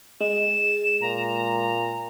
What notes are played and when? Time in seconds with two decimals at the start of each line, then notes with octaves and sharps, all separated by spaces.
0.21 G#3 E7
1.02 A#2 A#5